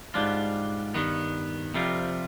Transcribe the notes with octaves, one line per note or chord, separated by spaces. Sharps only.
G#2 G3 D4 F4
G2 D#3 B3
F2 C3 G3 C4 F4